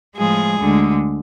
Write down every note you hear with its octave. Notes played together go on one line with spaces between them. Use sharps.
A2 F3 G#3 G#4
D2 D3 G#3